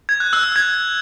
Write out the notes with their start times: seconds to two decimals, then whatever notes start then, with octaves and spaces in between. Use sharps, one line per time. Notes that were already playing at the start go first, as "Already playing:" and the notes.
0.09 G#6
0.20 F#6
0.33 E6
0.43 F#6
0.56 G#6